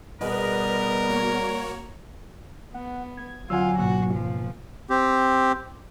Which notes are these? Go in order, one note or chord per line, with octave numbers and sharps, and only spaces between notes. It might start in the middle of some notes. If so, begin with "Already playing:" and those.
B2 G3 B3 G#4 A#4 B4 D#5
A#3 F#4 C#5
B3 F#5
G#6
D2 F#3 C4 F4 F#5 G#5 E6
C#2 G#2 B2 A#3 F#4 E6 F#6
F3
C4 G4